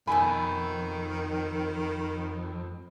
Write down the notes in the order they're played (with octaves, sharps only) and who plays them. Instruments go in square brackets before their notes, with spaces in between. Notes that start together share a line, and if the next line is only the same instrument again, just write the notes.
[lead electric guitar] F2 [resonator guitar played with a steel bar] B2 A3 G#5 [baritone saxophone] D#3 [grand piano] B5